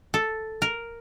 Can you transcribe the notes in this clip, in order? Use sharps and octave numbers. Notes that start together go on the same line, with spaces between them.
A4
A#4